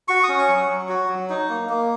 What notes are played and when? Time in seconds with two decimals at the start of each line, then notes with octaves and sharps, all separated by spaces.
0.08 F#4 C#6
0.23 D#6
0.29 C#4
0.39 C#6
0.48 F#3
0.69 F#3
0.89 F#4
1.08 F#3
1.30 D#4
1.49 A#3
1.69 A#3